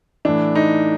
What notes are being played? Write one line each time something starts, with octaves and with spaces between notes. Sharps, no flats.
A2 E3 D4
D#4